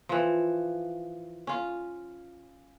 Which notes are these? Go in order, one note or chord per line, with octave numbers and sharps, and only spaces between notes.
E3 F3
C#4 F4